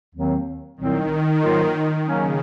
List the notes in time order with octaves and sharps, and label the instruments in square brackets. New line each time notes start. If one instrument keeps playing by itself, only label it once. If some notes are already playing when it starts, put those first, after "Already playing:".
[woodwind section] D#2 D#3 F#3 C4
[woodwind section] C2 A#2 F#3 C4 [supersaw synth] D#3
[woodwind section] G#2 F#3 A#3 F4 A#4
[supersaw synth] C#3 [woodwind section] F#3 A#3 C#4